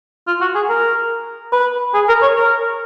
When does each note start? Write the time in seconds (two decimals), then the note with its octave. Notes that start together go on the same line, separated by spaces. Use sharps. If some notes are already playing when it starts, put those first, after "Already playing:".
0.27 F4
0.41 F#4
0.55 G#4
0.69 A#4
1.53 B4
1.94 G#4
2.09 A#4
2.22 C#5
2.36 A#4